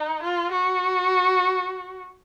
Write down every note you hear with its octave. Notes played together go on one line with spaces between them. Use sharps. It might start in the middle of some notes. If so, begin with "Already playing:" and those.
Already playing: D#4
F4
F#4